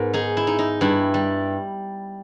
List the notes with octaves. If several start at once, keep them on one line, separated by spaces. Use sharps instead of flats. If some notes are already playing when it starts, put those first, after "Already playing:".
Already playing: G#2 B3 A#4
D#4 G#4
E4
D#4
D#4
G2 E4
G3